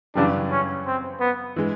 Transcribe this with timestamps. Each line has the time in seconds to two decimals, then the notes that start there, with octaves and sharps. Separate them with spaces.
0.15 F#2 C#3 E3 G3 D4
0.51 C#4
0.86 C4
1.21 B3
1.56 E3 G#3